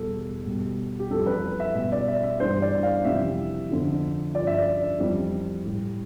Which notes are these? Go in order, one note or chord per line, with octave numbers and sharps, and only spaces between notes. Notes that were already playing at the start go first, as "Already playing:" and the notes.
Already playing: E2 B2 G3 A4
B2 G3
G4
F2 E3 G3 A4
B4
E5
B2 G3 E5
D5
E5
E5
G2 E3 G3 C5
D5
F5
F2 C3 E3 G3 E5
F2 D3 F3
G2 F3 D5
E5
D5
F2 E3 G3
A2 G3